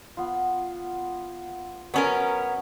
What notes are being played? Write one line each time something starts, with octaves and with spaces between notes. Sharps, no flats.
B3 F4
F#3 B3 C#4 A#4 C#6